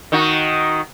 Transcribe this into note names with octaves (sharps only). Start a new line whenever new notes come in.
D#3 D#4 F#4